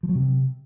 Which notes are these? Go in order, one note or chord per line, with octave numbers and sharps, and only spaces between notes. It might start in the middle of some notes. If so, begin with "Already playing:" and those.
F3
F#3
C3